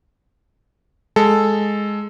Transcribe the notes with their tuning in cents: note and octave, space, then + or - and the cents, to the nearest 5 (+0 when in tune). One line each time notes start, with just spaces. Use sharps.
G#3 +0 A4 +0